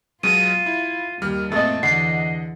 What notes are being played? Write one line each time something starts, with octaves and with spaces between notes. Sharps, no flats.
B2 F#3 G#3 F4 D#7
E4
D#2 D#3 G3 F6
A#2 A3 C4 A4 D#5
E2 D3 D#5 F#5 C7